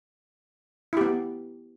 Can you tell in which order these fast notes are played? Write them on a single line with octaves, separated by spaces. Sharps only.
E4 G4 B3